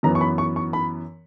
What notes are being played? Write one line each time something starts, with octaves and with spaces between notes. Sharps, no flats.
F#2 E3 B3 A#5
C#6
B5
C#6
C#6
B5